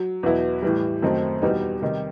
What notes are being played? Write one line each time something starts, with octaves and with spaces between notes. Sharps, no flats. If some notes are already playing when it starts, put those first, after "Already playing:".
Already playing: F#3
E2 B2 F#3 B3 E4
A2 E3 G3
F#2 D#3 A3 C4
E2 B2 G3 B3 D#4
C3 D#3 G3